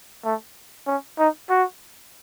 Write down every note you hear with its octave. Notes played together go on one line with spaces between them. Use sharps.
A3
C#4
D#4
F#4